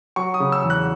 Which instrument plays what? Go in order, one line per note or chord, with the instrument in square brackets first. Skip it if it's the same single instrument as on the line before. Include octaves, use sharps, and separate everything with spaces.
[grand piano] F#3 C#6
D#6
C#3
E6
E2
F#6